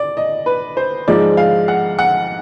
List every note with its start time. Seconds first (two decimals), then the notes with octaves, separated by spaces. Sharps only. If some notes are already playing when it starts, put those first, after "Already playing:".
Already playing: D5
0.17 D#5
0.46 B4
0.77 C5
1.08 G#2 F3 G#3 D5
1.37 F5
1.68 F#5
1.99 F#5